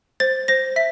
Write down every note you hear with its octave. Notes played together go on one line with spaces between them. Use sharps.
C5 A6
C5 A#6
E5 B6